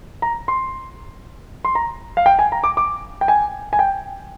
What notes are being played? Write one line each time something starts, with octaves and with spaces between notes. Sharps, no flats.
A#5
C6
C6
A#5
F5
G5
G#5
A#5
D6
D6
G5
G#5
G#5
G5